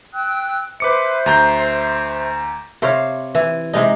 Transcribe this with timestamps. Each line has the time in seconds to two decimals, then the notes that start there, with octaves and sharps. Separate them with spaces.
0.14 G5 E6 F#6
0.80 B4 C5 E5 D6 C#7
1.26 D2 A#5 G6
2.82 C3 C5 C#5 F5
3.35 E3
3.73 C3 G#3 D#4